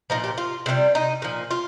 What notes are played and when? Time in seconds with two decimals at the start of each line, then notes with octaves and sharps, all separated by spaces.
0.10 A#2 F3 D#4
0.24 G4
0.38 F4
0.66 C3 D#3 G3
0.95 D#4
1.22 A#2 F3
1.51 F4